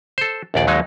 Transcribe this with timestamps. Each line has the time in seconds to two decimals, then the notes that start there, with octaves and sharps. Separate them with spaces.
0.18 A4 C5
0.54 A#1 D#2 D5
0.67 D#2 F#3 G#3 D#4